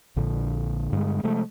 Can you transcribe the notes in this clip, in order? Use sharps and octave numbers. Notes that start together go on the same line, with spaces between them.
A#1 A#2 D3
G2 D3 G#3
C3 F3 G#3 A3